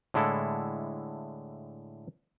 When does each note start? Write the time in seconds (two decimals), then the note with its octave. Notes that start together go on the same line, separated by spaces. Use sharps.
0.14 A2 D3 G#3 E4 A4